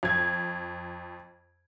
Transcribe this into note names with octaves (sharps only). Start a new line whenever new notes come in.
F2 G#6